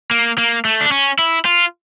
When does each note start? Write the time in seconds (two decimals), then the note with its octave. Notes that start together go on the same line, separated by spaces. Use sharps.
0.11 A#3
0.38 A#3
0.65 A3
0.81 D4
0.92 C#4
1.19 E4
1.45 F4